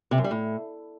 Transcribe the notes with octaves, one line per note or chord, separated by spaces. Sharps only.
C3
F#2
G3
A2